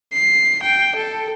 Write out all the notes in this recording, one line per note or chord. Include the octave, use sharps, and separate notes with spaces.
C7
G5
A4